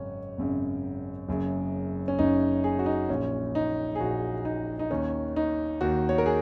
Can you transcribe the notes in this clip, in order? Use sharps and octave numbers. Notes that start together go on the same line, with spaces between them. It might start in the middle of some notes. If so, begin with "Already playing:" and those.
Already playing: G#1 F#2 C#3 C#4
G#1 F#2 C#3
F#1 F#2 C#3
C#4
F#1 F#2 C#3 D#4
G#4
F#4
D#4
A#1 A#2 C#4
D#4
G#4
A#1 A#2 F#4
D#4
D#4
D#2 D#3 C#4
D#4
D#2 D#3 F#4
C#5
A#4
G#4